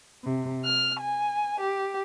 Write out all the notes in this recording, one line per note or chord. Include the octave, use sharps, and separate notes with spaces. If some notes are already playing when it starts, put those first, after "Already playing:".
C3
F6
G#5
G4